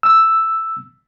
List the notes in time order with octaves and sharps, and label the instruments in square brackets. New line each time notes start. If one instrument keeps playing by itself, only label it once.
[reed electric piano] E6